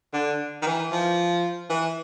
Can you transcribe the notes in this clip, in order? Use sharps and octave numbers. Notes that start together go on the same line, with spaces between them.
D3
D#3
E3
F3
E3